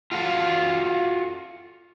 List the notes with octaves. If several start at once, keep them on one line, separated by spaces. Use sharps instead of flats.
F4 F#4 A4 F5